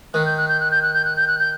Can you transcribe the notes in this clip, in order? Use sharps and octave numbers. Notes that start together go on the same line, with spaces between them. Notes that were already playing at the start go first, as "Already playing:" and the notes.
D#3 F#6
G6
F#6
G6
F#6
G6
F#6
G6
F#6
G6
F#6
G6